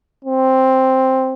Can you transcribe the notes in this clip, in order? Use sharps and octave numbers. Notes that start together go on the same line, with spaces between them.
C4